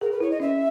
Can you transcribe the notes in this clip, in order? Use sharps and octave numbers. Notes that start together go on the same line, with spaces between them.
G#4 A#4
B4
E4 C#5
D#5
C#4 E5